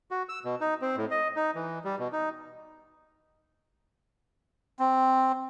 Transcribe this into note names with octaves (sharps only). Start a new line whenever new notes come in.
F#4
E6
B2
D#4
C4
A2
D#5
D#4
E3
G3
B2
D#4
C4